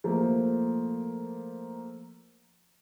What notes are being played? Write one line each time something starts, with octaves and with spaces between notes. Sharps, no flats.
F3 A3 A#3